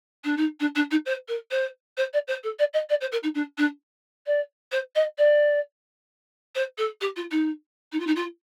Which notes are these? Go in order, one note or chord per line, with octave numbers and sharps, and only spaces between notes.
D4
D#4
D4
D4
D#4
C5
A#4
C5
C5
D5
C5
A4
D5
D#5
D5
C5
A#4
D#4
D4
D4
D5
C5
D#5
D5
C5
A4
G4
F4
D#4
D#4
F4
D#4
F4